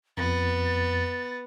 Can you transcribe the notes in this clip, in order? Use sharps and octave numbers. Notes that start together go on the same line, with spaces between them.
F2 B3 A6